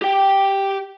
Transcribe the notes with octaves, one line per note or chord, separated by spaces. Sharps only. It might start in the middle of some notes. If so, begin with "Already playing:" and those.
G4 G5